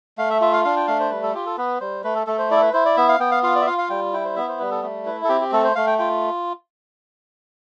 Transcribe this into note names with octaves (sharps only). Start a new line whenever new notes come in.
A3 F5
E5
F4 E5
F5
D4 F5
G5
A3 F5
C5
G3 B4
A4
F4 G4
A4
B3 B4
G3 C5
A3 B4
A4
A3 A4
C5
E4 D5
A4
B4
E4 C5
D5
B3 E5
F5
B3 G5
F5
F4 F5
D5
E5
F4 F5
F5
G3 G5
E4 G5
C5
B3 E5
C5
G3 B4
A4
A3
E4 B4
A4
C4 G4
G4
A3 A4
C5
A3 F5
G5
F4 G5